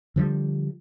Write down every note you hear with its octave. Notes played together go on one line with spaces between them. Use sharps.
D3 F3 G3